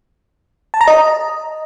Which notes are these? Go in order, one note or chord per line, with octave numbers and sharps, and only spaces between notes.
A5
A#5
D#5